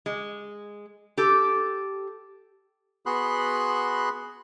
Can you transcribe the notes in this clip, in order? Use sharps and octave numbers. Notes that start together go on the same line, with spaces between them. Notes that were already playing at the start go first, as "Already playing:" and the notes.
G#3
G4 A4
B3 F#4 G#4 B5 C6 F#6